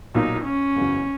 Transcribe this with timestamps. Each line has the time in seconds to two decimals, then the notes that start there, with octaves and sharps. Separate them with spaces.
0.15 B1 A#2 F#3 A#3 D#4
0.45 C#4
0.76 F#1 E2 C#3 F#3